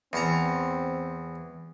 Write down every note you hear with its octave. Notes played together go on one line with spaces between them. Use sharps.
E2 C4 A5 A#5